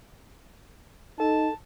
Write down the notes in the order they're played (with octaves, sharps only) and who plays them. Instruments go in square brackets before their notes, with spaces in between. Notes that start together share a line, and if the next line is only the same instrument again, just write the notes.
[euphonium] D#4 [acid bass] A4 [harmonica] A5